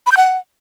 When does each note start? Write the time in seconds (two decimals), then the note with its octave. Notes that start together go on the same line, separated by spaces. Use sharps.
0.06 B5
0.12 G6
0.17 F#5